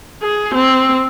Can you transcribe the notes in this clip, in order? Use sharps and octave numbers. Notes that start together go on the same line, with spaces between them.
G#4
C4